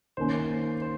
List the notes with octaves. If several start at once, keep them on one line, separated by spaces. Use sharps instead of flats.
D#3 A#3 C#4 C5